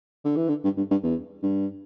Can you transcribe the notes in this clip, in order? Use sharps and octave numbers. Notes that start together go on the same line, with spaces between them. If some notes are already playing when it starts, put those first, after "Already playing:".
D3
E3
D3
G2
G2
G2
E2
G2